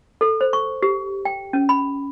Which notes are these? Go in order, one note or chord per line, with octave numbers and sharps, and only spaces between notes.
A4
C5
C#6
G4
G5
C#4
B5